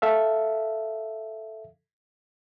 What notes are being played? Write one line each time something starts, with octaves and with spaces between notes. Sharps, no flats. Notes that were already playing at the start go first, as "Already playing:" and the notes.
A4 E5 F5